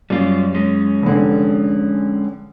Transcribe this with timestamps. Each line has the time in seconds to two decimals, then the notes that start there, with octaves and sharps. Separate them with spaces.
0.10 F#2 G3 F4
0.55 G#3 C#4
1.03 F1 D3